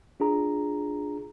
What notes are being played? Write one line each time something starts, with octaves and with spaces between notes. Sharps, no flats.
D4 F4 G#4 A#5